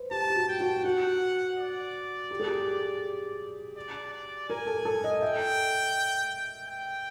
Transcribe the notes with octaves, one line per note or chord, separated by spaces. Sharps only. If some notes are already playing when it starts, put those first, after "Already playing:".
Already playing: B4 C5
G4 A5
G4
F#4
G5
F#4
F#4 F#5
D5
G4
G#4
G4
D5
D5
A#4 G#5
A4
A4
D#5
E5 G5
G5